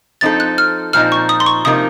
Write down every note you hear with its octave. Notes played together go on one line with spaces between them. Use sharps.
F3 C4 D#4 A4 A6
F#6
F6
A#2 F3 C4 D#4 F6
C#6
D#6
C6
C#6
C3 F3 A#3 D#4 D#6